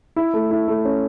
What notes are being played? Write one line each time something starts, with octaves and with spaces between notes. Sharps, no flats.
E4
A3
E4
A3
C#4